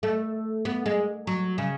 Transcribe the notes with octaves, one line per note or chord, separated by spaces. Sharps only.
A3
B3
G#3
F#3
C#3